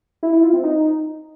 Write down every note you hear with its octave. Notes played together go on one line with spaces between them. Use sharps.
E4
E4
F4
C4
D#4